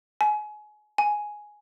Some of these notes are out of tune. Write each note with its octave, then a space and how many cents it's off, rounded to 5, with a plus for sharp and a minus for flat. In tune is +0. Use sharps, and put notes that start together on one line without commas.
G#5 +30
G#5 +5